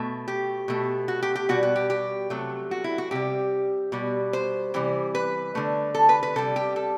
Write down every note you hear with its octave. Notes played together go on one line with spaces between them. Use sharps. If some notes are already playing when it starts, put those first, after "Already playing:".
Already playing: B2 A3
G4
B2 A3
F#4
G4
G4
B2 G3 F#4
F#4
G4
G4
C3 F#3 A3
F#4
E4
F#4
C3 G3 G4
B2 G3
C5
C3 E3 G3
B4
D3 A3
A4
B4
B4
C3 G3 A4
G4
A4